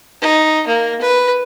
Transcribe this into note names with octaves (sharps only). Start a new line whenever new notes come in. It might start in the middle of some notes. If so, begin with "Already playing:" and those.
D#4
A#3
B4